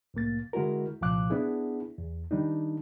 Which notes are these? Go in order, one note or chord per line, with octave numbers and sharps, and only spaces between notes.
C2 A2 A#3 A6
D3 G#3 E4 F#4 A#4
C2 A#2 F3 F5 D6 F#6
B3 D4 E4 G#4
E2
D#3 G3 D4 D#4